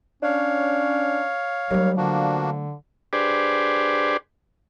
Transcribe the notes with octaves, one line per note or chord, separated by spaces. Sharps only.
C#4 D4 C#5 F5
D#2 F#3 G3 A3
D3 F3 A#3 D4 F#4
D4 G4 G#4 B4 C5 D5